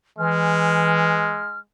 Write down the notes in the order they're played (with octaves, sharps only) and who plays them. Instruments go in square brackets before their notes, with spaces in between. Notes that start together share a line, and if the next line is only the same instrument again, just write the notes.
[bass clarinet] E3 [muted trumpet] G#3 [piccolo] F6